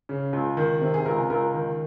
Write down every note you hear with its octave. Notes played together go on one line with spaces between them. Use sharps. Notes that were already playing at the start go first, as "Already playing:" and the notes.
C#3
C#2
D#3
C3
G#4
C#2 A#4
C#2 A#4
D#3